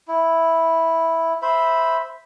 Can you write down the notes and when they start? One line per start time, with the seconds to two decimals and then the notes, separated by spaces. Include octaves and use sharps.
0.08 E4
1.42 C5 E5 B5